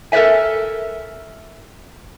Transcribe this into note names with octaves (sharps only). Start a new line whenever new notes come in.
A4 A#4 C5 D5 E5 G#5